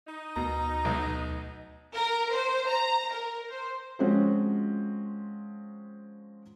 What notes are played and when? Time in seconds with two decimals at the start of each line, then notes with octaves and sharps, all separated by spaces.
0.07 D#4
0.36 D2 B2 A#5
0.85 B1
1.94 A#4
2.32 C5
2.68 A#5
3.10 A#4
3.49 C5
3.99 F3 G#3 C4 C#4 F#4